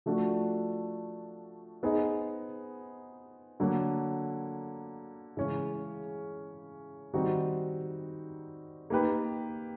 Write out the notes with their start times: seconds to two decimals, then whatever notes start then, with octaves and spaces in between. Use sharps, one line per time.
0.06 F3 A3 D4 F#4
1.83 B3 D#4 G#4 C5 D#5
3.60 D3 F#3 A#3
5.37 C#3 E3 G#3 C#4
7.14 D#3 G3 C4 D#4 F#4
8.90 A#3 D#4 G4 B4